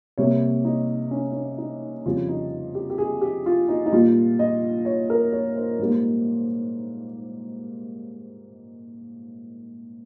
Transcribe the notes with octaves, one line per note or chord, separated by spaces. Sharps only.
C3 G3 A#3 C#5
D#4
C#4
C#4
D#4
F2 C#3 G3 F4
D#4
G4
G4
G#4
G4
F4
D#4
D#4
A#2 G3 A#3 F4
D#5
C#5
A#4
C#5
C5
G#2 G3 A#3